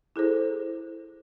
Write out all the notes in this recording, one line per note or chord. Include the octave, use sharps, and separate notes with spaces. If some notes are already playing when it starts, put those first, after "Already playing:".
E4 G#4 A4 C5